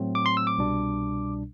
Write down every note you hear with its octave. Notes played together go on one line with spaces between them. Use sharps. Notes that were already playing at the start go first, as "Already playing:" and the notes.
Already playing: A2 F#3 A3 C4
D6
C6
E6
D6
C2 B2 G3 D4